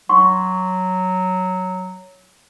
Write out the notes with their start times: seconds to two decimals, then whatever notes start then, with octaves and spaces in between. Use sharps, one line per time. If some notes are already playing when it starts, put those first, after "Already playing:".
0.09 F#3 F#5 C6 C#6